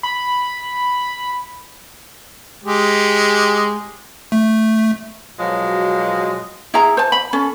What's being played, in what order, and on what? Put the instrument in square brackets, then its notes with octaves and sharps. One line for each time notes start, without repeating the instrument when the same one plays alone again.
[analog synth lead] B5
[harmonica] G#3 G4
[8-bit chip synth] A3
[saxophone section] B2 F3 F#3 G#3
[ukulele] E4 G#4 A#5
C5 A5
B5
C#4 A4